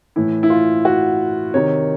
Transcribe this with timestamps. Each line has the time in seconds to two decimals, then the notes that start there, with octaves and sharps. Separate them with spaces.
0.16 A2 E3 E4
0.43 E4
0.50 F4
0.85 F#4
1.54 C3 D#3 C#5